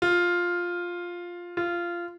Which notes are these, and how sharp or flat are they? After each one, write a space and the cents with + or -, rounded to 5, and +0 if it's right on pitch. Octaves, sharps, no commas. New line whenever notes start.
F4 +5
F4 -15